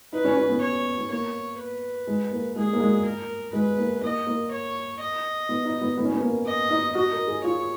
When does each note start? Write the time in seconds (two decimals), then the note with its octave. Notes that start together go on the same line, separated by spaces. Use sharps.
0.12 D#4 B4
0.25 C#4
0.37 C#4
0.49 B3
0.61 C#5
0.98 B3
1.09 A#3 C#5
1.59 B4
2.07 G#3
2.31 A#3
2.56 G#3 G#4
2.73 A#3
2.80 G#3
3.05 A#4
3.53 G#3 B4
3.78 A#3
4.02 A#3 D#5
4.27 A#3
4.51 C#5
5.00 D#5
5.49 B3
5.65 D#4
5.81 B3
5.97 B3
6.05 C#4
6.12 B3
6.21 A#3
6.46 D#5
6.70 D#4
6.95 F#4 D#5
7.11 A#4
7.27 G#4
7.44 F4 C#5